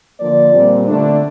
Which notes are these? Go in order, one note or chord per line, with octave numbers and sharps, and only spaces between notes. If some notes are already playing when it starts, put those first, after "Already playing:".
D3 F3 A#3 D5
A#2 G3 C4
D3 A3 D4